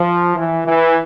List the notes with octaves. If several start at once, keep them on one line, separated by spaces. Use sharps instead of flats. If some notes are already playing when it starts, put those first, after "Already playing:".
Already playing: F3
E3
E3